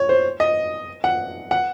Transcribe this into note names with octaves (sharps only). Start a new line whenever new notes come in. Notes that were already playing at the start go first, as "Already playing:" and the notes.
Already playing: C#5
C5
D#5
F#5
F#5